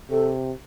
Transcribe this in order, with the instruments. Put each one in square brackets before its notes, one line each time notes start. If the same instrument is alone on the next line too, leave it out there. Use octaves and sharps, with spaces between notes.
[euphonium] C3 [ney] A4